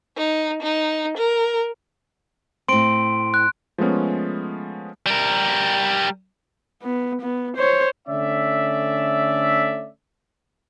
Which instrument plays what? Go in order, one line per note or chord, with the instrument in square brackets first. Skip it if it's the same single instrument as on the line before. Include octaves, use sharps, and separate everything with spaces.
[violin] D#4
D#4
A#4
[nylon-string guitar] A2 C4 [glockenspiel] C6 D7
[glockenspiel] F#6
[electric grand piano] F3 G#3 A3 B3 C#4
[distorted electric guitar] G3 A#4
[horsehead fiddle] B3
B3
C5 C#5
[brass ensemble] D3 A3 C#4 D5 E5